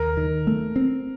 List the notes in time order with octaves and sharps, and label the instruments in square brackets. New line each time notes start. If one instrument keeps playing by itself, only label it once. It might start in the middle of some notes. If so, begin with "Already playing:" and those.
Already playing: [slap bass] D#2 [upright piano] A#4
[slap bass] D#3
A3
C4